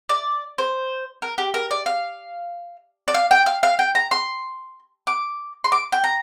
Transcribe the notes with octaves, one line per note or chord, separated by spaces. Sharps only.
D5
C5
A#4
G4
A#4
D5
F5
D5
F5
G5
F5
F5
G5
A#5
C6
D6
C6
D6
G5
A#5